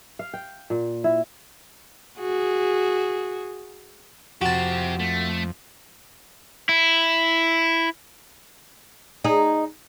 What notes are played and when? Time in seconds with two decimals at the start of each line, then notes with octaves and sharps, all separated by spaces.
0.19 F5
0.34 G5
0.70 A#2
1.04 E4
2.19 F#4 G#4
4.41 F2 C4 F#4 G4 A5
4.99 A3
6.69 E4
9.24 D#4 G#4